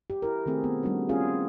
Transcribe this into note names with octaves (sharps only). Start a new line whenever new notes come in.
G4
E4 A#4
D#3 A3 C4 G#4 A4
B3
G3 A3 C#4 D4 F#4
C4 C#4 F4 G#4 F5